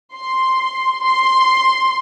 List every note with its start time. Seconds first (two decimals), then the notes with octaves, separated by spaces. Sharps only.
0.15 C6
1.04 C6